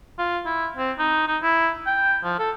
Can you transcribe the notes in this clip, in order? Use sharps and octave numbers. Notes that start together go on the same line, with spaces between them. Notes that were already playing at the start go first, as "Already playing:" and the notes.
F4
E4
C4
D#4
D#4
E4
G5
F3
A4